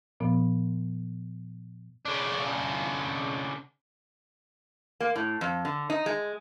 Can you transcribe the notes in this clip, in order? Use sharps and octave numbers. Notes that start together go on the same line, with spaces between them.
A#2 F3 B3
C#3 D4
A#3
A2
F2
D3
D#4
G#3